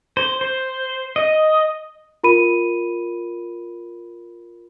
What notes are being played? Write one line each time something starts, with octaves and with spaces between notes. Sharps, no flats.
C5
C5
D#5
F4 A#4 B5 D#7